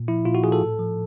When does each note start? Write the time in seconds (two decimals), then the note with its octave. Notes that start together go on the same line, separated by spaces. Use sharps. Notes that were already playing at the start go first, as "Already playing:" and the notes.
Already playing: A#2
0.08 F3 E4
0.25 A#2 F4
0.35 F#4
0.44 F3 G#4
0.52 A4
0.61 A2
0.79 F3